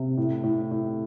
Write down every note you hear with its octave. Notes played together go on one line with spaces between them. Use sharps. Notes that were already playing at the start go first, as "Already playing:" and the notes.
Already playing: C3
A2
A2
A2